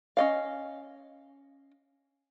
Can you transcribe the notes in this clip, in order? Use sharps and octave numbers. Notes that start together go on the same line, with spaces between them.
C#4 D#5 F5